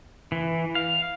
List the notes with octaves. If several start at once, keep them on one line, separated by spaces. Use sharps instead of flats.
E3
F5